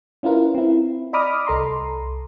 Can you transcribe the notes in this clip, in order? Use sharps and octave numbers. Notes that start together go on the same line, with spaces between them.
C#4 E4 F4 A#4 B4
C4 E4
D5 D#5 B5 D6 D#6 F6
C2 A4 A#5 C6